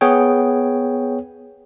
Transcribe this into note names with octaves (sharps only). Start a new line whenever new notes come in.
B3 G#4 C#5 G5